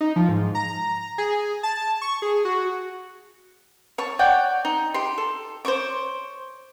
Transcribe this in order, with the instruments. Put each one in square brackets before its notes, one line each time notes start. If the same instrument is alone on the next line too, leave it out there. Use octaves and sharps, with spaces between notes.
[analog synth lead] D#4
F3
G#2
A#5
G#4
A5
C#6
G#4
F#4
[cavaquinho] C#5 A5 C#6
C#5 D5 F#5 G5
D#4
G4 C6
A4
C5 C#5 C#6 D6